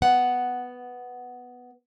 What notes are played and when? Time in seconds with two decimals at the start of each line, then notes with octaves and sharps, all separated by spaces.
0.02 B3 F#5